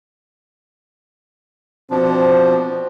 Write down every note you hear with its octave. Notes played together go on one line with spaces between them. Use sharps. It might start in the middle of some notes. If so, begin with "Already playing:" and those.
B2 F3 C4 D4